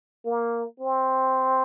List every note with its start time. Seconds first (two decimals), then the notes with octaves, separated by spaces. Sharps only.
0.26 A#3
0.80 C4